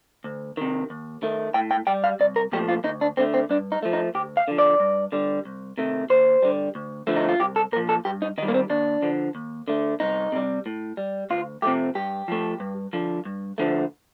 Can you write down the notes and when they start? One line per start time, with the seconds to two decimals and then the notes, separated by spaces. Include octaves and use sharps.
0.24 D2
0.57 C3 D#3
0.90 D#2
1.23 D#3 A3
1.54 A2 G5
1.71 G5
1.87 G3 G5
2.04 F5
2.20 C2 D5
2.36 A#4
2.52 A#2 F3 A3 G4
2.69 F4
2.84 D2 D#4
3.01 D4
3.17 D3 A3 C4
3.34 C4
3.49 G2 D4
3.72 D#4
3.83 F3 A3
3.93 D#4
4.15 D2 G4
4.37 F5
4.48 D3 F3
4.58 D5
4.80 G2
5.12 D3 G3
5.45 C2
5.78 C3 D#3 A3
6.10 D#2 C5
6.42 D3 G3
6.75 D2
7.07 D3 F3 A3
7.16 D#4
7.29 F4
7.39 C2 G4
7.56 A4
7.72 A#2 A#4
7.77 F3
7.89 A4
8.05 G2 G4
8.22 D#4
8.38 D#3 D#4
8.43 G3
8.48 A#3
8.54 C4
8.70 D#2 D4
9.02 D3 F3
9.35 D#2
9.68 D3 A3
10.00 C2 D#4
10.32 C3 G3
10.66 A2
10.97 G3
11.30 D2 F4
11.62 C3 F3 A3 G4
11.95 G2 G4
12.28 F3 A3
12.60 G2
12.93 D3 F3
13.25 G2
13.58 D3 F3 A3